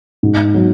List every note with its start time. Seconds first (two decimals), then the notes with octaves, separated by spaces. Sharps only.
0.23 G#2
0.54 F#3